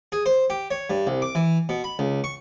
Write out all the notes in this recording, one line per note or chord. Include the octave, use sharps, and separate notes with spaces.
G#4
C5
G4
C#5
G2
C2
D6
E3
B2
B5
C#2
C#6